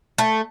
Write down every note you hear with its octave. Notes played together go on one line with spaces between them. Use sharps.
A3